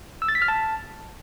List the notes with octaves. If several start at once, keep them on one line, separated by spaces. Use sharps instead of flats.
E6
A6
B6
F6
A5